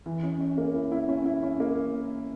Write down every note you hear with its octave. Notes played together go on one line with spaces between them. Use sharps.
E3
C#4
C#4
A#3
E4
E4
C#4
E4
C#4
A#3